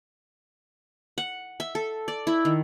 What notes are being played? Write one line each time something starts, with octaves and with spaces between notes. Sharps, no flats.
F#5
E5
A4
D5
E4
D#3